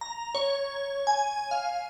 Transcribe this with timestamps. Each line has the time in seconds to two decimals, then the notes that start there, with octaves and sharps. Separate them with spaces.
0.01 A#5
0.35 C#5
1.07 G#5
1.51 F5